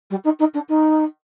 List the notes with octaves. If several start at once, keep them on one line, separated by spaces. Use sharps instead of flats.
G3
D#4
D#4
D4
D#4